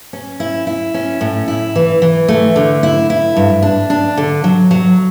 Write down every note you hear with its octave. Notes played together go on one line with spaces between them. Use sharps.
C#4
E4
E4
C#4
A2
E4
E3
E3
A3
D3
E4
E4
G2
D4
D4
D3
F#3
F#3